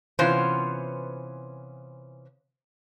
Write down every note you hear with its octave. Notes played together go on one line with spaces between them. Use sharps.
C3 E3 B3 C#4 F4 C5